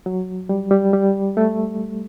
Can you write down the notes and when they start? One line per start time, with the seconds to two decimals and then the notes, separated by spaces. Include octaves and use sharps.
0.06 F#3
0.49 G3
0.71 G3
0.93 G3
1.37 A3